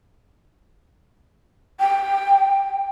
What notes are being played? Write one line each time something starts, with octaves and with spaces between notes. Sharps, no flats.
G5